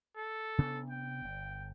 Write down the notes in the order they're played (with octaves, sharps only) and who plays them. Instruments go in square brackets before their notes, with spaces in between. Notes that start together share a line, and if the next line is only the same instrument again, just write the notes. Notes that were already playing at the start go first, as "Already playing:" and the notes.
[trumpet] A4
[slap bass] C3 B3 D4
[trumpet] G5
[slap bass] G1